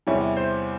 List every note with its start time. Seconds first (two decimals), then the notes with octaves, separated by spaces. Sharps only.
0.07 E2 C3 E3 G3 C#5
0.37 C5